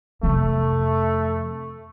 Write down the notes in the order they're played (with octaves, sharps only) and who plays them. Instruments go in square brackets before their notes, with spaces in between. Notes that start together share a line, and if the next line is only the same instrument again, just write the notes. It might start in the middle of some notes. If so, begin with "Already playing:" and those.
[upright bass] F2 C3 [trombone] A3